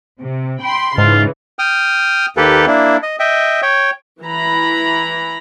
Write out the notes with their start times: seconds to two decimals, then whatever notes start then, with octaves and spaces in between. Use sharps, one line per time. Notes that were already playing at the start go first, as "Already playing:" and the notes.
0.21 C3
0.62 G5 B5 C6
0.98 G#2 C#3 E3 F4
1.59 G5 D#6 F6
2.37 D#2 A#3 G4 A4 B4
2.67 A#3 D4 E4
3.03 D#5
3.20 D#5 E5 G5
3.62 C#5 G5
4.22 E3 A#5 B5